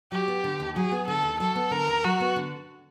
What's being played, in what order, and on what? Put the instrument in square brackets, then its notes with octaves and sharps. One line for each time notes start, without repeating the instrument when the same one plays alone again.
[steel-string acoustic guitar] F#3 [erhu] G4
[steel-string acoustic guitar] B3
D3
D#2
[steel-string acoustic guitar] F#3 [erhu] G#4
[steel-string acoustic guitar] B3
[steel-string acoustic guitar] D3 [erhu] A4
[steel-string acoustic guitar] D#2
[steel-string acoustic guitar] F#3 [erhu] A4
[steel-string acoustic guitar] B3
[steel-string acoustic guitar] D3 [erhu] A#4
[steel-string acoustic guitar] D#2
[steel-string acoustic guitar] F#3 [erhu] F#4
[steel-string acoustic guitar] B3
D3